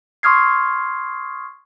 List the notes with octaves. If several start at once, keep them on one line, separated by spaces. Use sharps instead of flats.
C6 C#6 D#6 F6 G#6 C7